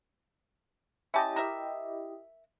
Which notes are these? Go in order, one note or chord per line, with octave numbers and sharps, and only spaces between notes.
C#4 E4 G4 D#5 A5
A#4 E5